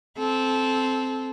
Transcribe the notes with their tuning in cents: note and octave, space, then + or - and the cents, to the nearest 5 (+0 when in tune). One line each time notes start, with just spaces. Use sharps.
C4 +0 A4 -20